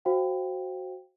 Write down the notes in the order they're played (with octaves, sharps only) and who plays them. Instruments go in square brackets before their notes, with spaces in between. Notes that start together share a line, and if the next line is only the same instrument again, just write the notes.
[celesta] F#4 C5 F5 G5